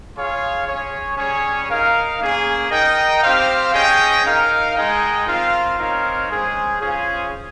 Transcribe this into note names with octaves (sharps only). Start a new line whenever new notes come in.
F4 G#4 C#5 F5
C#4 G#4 C#5
G3 C#4 G#4 C#5
D#4 A#4 F5
A#3 C#4 G#4
D#4 A#4 D#5 G5
C4 G4 C5 F5
C#4 G#4 D#5 G5
D#4 A#4 F5
G#3 D#4 G#4 D#5 G5
C4 F4 A#4 F5
C4 D#4 A#4 C#5 F5
G#3 C#4 G#4 C5
C#4 F4 G#4 C5 F5